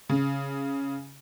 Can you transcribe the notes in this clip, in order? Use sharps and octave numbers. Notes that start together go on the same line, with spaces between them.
C#3